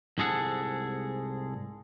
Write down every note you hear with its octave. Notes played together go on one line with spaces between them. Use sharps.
C2 G#2 G#3 G#4 A4 F#5